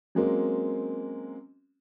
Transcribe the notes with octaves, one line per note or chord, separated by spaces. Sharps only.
F#3 G#3 A#3 C4 C#4